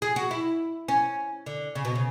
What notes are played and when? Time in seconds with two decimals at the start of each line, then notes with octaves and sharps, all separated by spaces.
0.02 G#4
0.16 F#4
0.31 E4
0.88 C#4
1.46 D3
1.75 C#3
1.85 B2
1.95 C#3